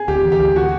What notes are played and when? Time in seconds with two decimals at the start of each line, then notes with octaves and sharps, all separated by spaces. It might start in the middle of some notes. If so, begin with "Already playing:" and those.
Already playing: G#4
0.08 D2 G4
0.24 E3
0.32 G4
0.41 D2
0.56 F#4